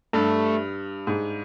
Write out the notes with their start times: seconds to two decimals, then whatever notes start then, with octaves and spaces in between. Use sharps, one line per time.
0.13 G2 A3
1.07 G#2